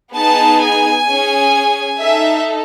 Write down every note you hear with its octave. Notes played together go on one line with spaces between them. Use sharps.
B3 D#4 G#4 A5
G#5
C#4 G#4
D#4 A4 E5